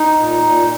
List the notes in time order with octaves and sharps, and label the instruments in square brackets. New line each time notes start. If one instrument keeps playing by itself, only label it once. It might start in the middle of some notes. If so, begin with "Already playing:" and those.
Already playing: [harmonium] D#4
A#2
A#2